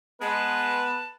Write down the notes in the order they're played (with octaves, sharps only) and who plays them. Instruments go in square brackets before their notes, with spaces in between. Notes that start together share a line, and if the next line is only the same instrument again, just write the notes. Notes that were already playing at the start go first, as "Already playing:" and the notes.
[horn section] G#3 [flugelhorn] B3 [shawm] B4 [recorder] A5